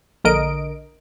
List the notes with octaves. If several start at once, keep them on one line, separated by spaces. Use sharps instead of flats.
A#1 D3 A#4 D#5 D7